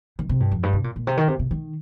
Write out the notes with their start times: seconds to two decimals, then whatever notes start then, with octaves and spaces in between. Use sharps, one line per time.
0.19 D#3
0.29 C3
0.40 G2
0.52 F2
0.63 G2
0.73 C3
0.84 A#2
0.96 A#2
1.07 C3
1.17 D#3
1.28 C3
1.39 C3
1.51 D#3